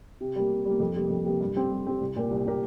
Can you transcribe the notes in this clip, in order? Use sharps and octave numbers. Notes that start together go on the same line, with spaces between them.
C3
G3 A#3
C3
G3 A#3
F2
C3 G3 A#3
F2
C3 G3 A#3
G2
G3 C4 G4
G2
G3 C4 G4
C2
A#2 A#3 G4 A#4
C2
A#2 A#3 G4 A#4